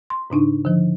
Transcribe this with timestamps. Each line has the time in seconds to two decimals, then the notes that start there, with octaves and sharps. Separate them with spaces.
0.10 C6
0.30 G#2 C#3 D4 D#4
0.65 D3 F3